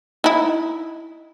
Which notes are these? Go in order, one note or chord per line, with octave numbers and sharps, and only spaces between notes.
D#4 E4